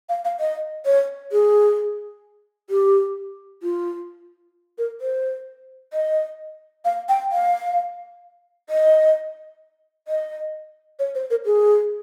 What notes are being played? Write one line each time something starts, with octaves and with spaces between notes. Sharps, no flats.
F5
F5
D#5
C#5
G#4
G4
F4
A#4
C5
D#5
F5
G5
F5
D#5
D#5
C#5
C5
A#4
G#4